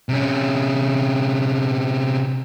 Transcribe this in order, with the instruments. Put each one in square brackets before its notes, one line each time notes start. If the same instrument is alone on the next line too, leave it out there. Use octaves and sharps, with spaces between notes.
[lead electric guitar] C3 C#4